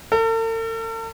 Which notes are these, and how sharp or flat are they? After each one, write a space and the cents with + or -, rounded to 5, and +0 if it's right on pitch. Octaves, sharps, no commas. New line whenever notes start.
A4 +45